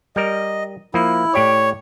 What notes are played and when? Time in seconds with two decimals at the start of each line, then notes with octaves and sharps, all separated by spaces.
0.16 G3 A#4 D#5
0.94 F3 A#3 E4
1.34 A2 G4 C#5 D5